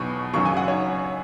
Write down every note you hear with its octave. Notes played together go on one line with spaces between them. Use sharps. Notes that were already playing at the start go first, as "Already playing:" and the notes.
Already playing: E2 B2 F#3 C#6
F#2 C#3 F#3 C#6
G#5
F#5
C#5